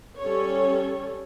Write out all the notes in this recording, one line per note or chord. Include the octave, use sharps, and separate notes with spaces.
G3 C#4 A4 C#5